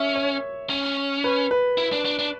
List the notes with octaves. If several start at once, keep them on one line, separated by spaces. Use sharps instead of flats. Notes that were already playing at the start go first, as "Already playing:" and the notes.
Already playing: C#4 E5
C#5
C#4
B4
B4
E4
D4
D4
D4